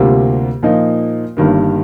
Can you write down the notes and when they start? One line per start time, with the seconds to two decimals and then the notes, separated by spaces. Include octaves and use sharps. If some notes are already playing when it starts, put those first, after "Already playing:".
Already playing: D2 C3 G3 A#3 F4
0.63 A#2 F3 A#3 D#4
1.37 G1 G2 D#3 A#3